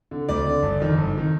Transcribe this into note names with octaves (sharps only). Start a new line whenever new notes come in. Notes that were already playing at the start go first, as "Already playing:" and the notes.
D3
D2 D5
D3
G1
F2 D#3
G1
D#3